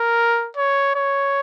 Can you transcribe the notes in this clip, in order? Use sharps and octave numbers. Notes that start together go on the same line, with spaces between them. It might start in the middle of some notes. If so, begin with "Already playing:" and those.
Already playing: A#4
C#5
C#5